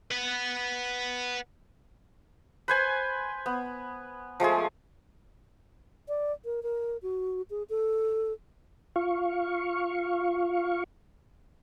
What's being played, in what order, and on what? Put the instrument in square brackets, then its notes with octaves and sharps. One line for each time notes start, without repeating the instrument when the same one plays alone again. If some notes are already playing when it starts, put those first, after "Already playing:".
[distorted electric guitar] B4 F#5
[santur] B4 C5 G#5
B3
F3 G#3 A3 G#4
[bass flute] D5
A#4
A#4
F#4
G#4
A4
[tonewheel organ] F4 F5 C#6